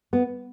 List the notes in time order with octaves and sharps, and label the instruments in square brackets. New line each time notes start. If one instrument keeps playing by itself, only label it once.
[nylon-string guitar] B3